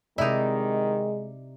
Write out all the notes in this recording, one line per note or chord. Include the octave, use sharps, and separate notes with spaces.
C3 D#3 G#3 D#4 E4 D5